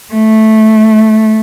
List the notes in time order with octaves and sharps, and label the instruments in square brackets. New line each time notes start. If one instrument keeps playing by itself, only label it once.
[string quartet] A3